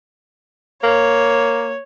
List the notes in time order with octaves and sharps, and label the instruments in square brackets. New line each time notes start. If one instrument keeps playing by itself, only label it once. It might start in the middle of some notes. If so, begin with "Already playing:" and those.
[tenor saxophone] A#3 [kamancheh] C#5